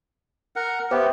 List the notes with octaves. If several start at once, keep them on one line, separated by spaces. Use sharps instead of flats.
A#4 F#5
B3 G4 C5 E5